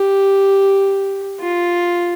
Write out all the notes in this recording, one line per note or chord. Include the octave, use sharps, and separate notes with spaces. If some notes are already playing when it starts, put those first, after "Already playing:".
Already playing: G4
F4